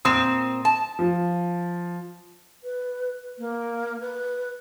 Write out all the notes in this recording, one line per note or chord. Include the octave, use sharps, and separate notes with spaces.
A#2 C4 D#6 E7
A5
F3
B4
A#3
B4